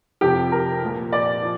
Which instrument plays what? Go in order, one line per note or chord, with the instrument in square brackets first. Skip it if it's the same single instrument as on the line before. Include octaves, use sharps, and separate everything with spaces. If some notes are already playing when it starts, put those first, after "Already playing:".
[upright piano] F2 C3 F3 G4
A#4
A#2 F3
D5
F3